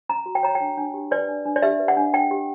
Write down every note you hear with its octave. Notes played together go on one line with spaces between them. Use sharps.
C#4 A#5
F#4
G5
C#5 A#5
G5
D4
D4
G4
B4 D5
D4
D4
D5
G4 E5
B4
F#5
D4
D4 G5
G4